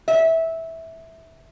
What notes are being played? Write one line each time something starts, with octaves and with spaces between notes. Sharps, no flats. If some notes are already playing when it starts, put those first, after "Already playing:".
E5